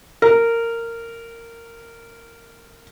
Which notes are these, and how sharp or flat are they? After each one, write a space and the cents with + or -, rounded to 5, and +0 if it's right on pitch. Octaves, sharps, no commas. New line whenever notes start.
A#4 -15